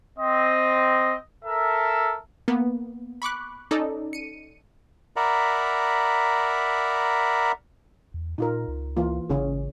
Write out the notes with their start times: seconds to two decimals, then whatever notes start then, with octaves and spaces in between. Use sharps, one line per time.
0.18 C4 D#5
1.44 A4 A#4 E5 A5
2.48 A#3 B3
3.22 B5 C#6 D6 F#6
3.71 C#4 D#4 A4 D5 D#5
4.13 C#7 D#7
5.16 A#4 D5 E5 F#5 A#5 B5
8.14 E2
8.38 A#2 D#4 F4 A#4
8.68 C#2
8.97 E3 A#3 F4
9.29 G#1 C#3 C#4 G#4